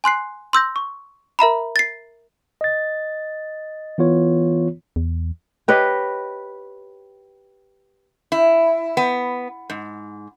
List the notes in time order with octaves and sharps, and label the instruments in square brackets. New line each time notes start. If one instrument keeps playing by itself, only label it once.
[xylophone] G#5 C6 F#6 C7
C6 E6 G6 A#6
C#6
A#4 E5 A#5 B5
A6 C7
[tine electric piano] D#5 A6
E3 B3 F4 C#5
[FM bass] E2
[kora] G4 B4 C#5 D#5
[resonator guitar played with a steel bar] E4
B3
G#2